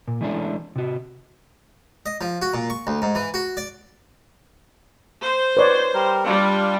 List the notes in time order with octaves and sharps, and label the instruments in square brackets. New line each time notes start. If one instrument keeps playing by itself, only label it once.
[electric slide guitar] A#2
E3 G#3 A3 C#4 D4
C3 F#4
[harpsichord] D#5
F3
F#4
A#2
C#6
D2
G#2
E3
F#4
D5
[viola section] C5
[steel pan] B4 C#5 D5
[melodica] G3 A#4
[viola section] G3 [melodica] D4 F4 F5